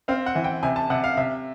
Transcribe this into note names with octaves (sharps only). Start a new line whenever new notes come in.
C4 F5
F#5
E3
G5
C3 G#5
A5
C3 F#5
F5
C3 E5